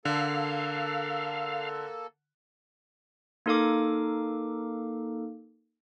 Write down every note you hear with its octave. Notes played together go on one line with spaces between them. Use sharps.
D3 A#3 A4 F5
A#3 D#4 A4 A#4 F5 D6